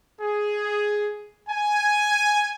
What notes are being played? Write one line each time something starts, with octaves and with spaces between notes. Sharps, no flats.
G#4
G#5